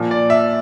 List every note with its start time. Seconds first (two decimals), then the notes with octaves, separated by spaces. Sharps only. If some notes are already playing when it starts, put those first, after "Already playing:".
Already playing: A#2 F3
0.11 D5
0.30 E5